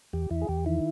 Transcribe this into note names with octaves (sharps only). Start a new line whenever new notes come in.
E2 G4
E2 E4
G#4
E2 G4
D#3 E4